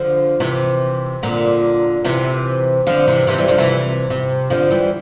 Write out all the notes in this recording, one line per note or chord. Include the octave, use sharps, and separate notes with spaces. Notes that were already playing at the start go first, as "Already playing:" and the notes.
Already playing: D3 F3
C3 E3
A#2 D3
C3 E3
D3 F3
C3 E3
C3 E3
E3 G3
D3 F3
C3 E3
C3
D3 F3
E3 G3